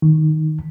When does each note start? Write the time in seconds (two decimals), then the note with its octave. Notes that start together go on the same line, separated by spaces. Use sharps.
0.02 D#3